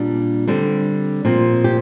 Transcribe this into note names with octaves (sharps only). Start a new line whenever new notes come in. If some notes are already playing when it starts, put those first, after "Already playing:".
Already playing: A#2 G3 D4
D3 G3 C4 D4
A#2 F3 C4
G4